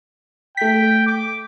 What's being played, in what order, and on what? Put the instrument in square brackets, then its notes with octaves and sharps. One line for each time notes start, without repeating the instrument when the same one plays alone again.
[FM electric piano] A3 B6 [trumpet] G5
[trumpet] D6